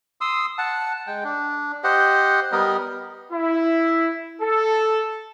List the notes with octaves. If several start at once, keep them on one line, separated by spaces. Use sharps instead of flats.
C6 D#6 E6
F#5 A5
G#3 G5
D4
G4 C5 D#5 F#5
G3 B3 A#4 D#5
E4
A4